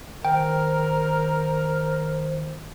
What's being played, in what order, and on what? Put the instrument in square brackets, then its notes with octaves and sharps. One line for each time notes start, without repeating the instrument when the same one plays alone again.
[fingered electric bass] D#3 [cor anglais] A#4 [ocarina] C5 [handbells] G5